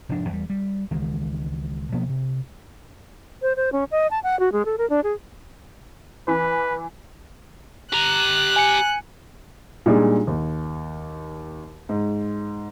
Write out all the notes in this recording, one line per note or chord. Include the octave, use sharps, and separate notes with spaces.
F1 G#2 F3 D4
E2 G3
G3
C#2 D#3 E3 G#3
B2 F3 A#3 B3
C3
C5
C5
C#4
D#5
A5
F#5
F#4
G#3
A4
A#4
D4
G#4
E3 B4
G4 A#5 F#6
G#5 C#7
A#2 G3 G#3 D4 D#4 G#4
D#2
G#2